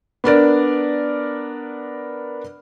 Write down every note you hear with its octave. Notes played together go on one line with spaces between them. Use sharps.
B3 D4 A#4 D5